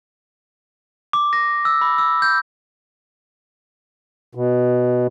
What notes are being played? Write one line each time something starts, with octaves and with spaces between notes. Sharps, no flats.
D6
A#6
E6
B5
E6
G6
B2